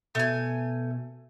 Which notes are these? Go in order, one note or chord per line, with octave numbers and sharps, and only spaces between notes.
B2 A3 G#5